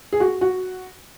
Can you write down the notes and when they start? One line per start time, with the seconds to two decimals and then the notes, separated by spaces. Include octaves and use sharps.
0.13 G#4
0.20 F#4
0.41 F#4